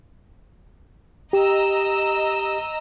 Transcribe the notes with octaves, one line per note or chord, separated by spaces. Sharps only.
G4 D#5 A#5 E6